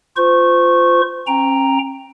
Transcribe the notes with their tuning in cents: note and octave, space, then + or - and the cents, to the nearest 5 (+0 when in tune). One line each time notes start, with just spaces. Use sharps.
F4 +0 C5 -30 C#6 -15
C#4 -40 G5 +10 A#5 +0